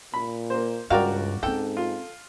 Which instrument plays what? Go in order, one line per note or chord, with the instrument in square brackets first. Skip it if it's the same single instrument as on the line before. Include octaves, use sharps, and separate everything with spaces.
[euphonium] A#2 [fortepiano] B5
[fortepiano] A#3 C5
[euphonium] C#2 [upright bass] G2 [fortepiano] F#4 A#4 D5 [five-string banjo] F5 G5
[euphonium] G#2 [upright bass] C4 C#4 [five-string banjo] A4 G5
[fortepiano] F4